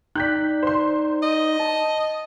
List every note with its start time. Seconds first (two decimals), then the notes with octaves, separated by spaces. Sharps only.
0.15 D#4 D5 G5 F#6 G6 B6
0.63 C5 C6
1.23 D#5
1.59 A5